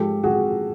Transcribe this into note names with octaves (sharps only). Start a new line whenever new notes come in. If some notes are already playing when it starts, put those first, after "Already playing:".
Already playing: G#2 F3 G#3 G4 A4
F#4 G#4